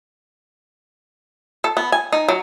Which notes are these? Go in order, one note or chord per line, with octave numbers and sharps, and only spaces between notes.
A4
B3
G#5
D#4
F#3